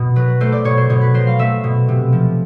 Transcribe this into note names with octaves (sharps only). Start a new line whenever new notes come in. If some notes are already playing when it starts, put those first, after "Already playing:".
Already playing: B2
F#3 B4
A3 C5
D5
B2 C#5
C5
B2 C#5
B4
F#3 C5
F5
A3 E5
B2
C3
F3